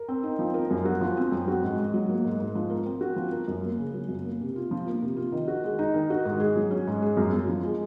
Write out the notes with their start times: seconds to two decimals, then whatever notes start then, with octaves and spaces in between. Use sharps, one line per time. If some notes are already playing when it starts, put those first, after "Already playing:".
Already playing: A#4
0.08 C4
0.23 D#4
0.39 F3
0.54 A#4
0.71 F#2
0.85 F#4
1.01 F3
1.17 C4
1.32 F#2
1.48 F#4
1.63 G#2
1.79 G#2
1.94 F#3
2.09 A#3
2.25 G#2
2.40 G#2
2.55 F3
2.70 A#4
2.86 C4
3.01 F#4
3.16 F3
3.32 A#4
3.48 F#2
3.64 A#3
3.79 C#3
3.94 F#3
4.09 F#2
4.25 A#3
4.40 C3
4.56 F4
4.71 F3
4.87 A#3
5.02 C3
5.17 F4
5.32 D#3
5.48 F#4
5.64 G#3
5.79 D#4
5.94 D#3
6.10 F#4
6.25 G#2
6.40 G#4
6.56 F#3
6.71 C#4
6.87 G#2
7.02 G#4
7.17 F#2
7.33 F#2
7.48 F3
7.64 G#3